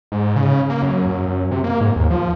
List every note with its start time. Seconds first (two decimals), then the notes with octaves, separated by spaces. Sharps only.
0.12 G#2
0.36 C#3
0.70 A#3
0.82 F#2
1.09 F#2
1.51 C3
1.64 A#3
1.81 G#2
1.96 D#2
2.10 F3